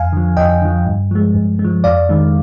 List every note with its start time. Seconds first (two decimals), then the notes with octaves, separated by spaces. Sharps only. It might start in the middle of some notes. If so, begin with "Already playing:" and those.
Already playing: F2 F5 G#5
0.13 D3 F3
0.37 F2 D#5 G5
0.62 D3 F3
0.86 G2
1.11 F3 G#3
1.34 G2
1.59 G#3
1.64 F3
1.84 F2 D5 F5
2.09 D#3 G#3